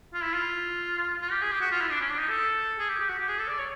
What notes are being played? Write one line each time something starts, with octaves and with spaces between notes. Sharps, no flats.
F4
E4
F4
F4
G4
G#4
G4
F#4
F4
E4
D4
C#4
D4
D#4
A4
G#4
G4
G4
F#4
G4
G#4
A4
D5
C#5